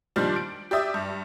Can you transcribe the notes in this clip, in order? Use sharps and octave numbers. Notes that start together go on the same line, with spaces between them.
A#2 D#3 F3 G3 D4
D7
G4 D5 E5 D#6
G2